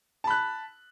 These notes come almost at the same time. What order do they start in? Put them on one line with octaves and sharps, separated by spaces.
A5 B5 F#6